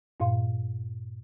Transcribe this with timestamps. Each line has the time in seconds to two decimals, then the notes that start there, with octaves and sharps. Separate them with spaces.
0.20 G2 A#2 F5 C6